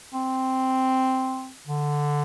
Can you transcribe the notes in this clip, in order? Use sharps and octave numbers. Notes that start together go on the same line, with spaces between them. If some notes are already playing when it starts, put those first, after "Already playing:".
C4
D3